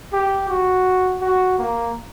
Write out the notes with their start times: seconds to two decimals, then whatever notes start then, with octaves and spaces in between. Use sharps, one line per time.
0.13 G4
0.49 F#4
1.22 F#4
1.58 A#3